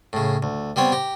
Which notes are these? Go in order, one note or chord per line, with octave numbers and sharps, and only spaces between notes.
A2 C#3
D2
G3 B3 C4 C#5
G4 A#5